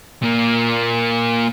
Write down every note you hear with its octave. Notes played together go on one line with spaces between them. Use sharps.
A#2 A#3